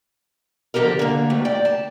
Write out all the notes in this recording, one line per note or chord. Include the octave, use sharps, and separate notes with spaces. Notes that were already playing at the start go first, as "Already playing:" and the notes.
D3 F3 F#4 G4 A4 A#4
D3 A#3
D2 A2 G3
D5 G5
A5